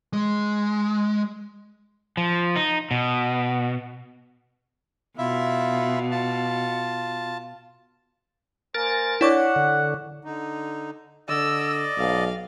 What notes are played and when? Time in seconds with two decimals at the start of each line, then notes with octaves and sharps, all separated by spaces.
0.13 G#3
2.17 F3
2.56 D#4
2.91 B2
5.18 B2 E4 F4 E5
6.11 F4 A5
8.75 A#3 A#4 C5 G#5 A6
9.21 D4 E4 C#5 D5 F#5 C#6 D6
9.56 D3
10.25 D3 D#4
11.29 D3 D5 D#5 E6
11.98 B1 F5